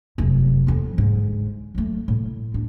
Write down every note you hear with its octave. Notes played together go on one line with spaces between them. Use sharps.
F1 F#2
F2 C#4
G#2 D3
F#3 A3
A2
D4